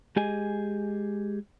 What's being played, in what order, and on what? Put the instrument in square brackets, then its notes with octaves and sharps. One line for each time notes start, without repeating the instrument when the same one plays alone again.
[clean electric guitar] G#3 G4 G#4 D#5 G#5